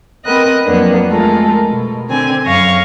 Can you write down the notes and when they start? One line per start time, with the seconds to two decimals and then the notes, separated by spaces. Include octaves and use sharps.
0.24 B3 C4 A#4 D#5 F#6
0.66 F2 F#3 A#3 B3 D4
1.07 G#3 A3 F4 A4 A#4
1.71 B2
2.09 D3 C4 G#5
2.45 F#2 F5 C#6 A#6